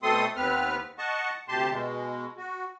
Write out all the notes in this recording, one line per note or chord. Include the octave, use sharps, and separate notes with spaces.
B2 A3 C4 A4 C6 D#6
D#2 B3 C4 B4 F6
D#5 F#5 A5 C#6
D2 C3 G4 A5 C6
B2 G#3
F#4